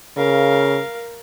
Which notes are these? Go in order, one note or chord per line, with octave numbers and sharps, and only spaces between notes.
C#3 A#4 F5